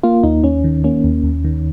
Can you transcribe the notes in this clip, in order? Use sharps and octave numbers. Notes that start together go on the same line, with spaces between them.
A#3 F4
D#2 D#4
D#2 C#4
D#3
A#3 C#4
D#2
D#2
D#3